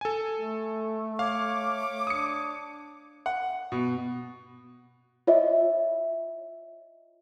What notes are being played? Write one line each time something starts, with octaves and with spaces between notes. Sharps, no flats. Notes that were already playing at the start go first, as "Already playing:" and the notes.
A4 G#5
A3
C#5 F5 D6
D4 D#6 C#7
F#5
B2
F4 C#5 D#5 E5